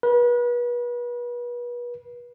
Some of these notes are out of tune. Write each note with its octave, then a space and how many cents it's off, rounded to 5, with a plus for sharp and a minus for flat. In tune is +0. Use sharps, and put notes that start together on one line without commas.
B4 -35